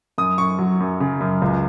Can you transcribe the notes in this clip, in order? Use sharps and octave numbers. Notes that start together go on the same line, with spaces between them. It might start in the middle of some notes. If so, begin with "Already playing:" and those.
F#2 D#6
F#2 C#6
F#3
F#2
C#3
F#2
C#2